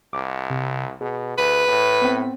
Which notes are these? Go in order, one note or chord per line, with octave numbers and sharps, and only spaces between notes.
C2 D6
C3
B2 G#4
D2 B4
A2
B3 C4